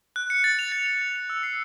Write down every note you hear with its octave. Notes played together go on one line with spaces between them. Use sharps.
F#6
C#7
A6
F7
A6
F7
A6
F7
E6
C7